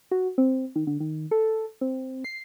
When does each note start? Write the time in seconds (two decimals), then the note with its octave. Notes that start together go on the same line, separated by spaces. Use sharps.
0.11 F#4
0.38 C4
0.76 D#3
0.87 D3
1.00 D#3
1.31 A4
1.81 C4
2.24 C7